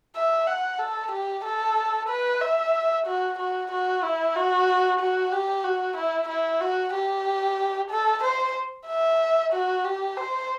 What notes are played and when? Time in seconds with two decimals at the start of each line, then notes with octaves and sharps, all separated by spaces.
0.16 E5
0.47 F#5
0.79 A4
1.12 G4
1.45 A4
2.09 B4
2.41 E5
3.07 F#4
3.39 F#4
3.71 F#4
4.03 E4
4.36 F#4
5.00 F#4
5.32 G4
5.64 F#4
5.97 E4
6.29 E4
6.61 F#4
6.94 G4
7.91 A4
8.24 C5
8.88 E5
9.53 F#4
9.85 G4
10.17 C5